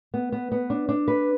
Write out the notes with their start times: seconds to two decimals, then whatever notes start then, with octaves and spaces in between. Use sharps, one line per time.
0.14 B3
0.32 B3
0.52 B3
0.70 D4
0.89 D4
1.08 B4